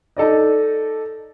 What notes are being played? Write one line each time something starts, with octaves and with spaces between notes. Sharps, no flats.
D#4 A4 D5 D#5